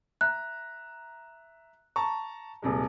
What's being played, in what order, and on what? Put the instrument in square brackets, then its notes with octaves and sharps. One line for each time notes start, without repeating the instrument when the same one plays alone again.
[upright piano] E5 A#5 [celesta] F#6
[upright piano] A5 A#5 C#6
D#1 C3 G#3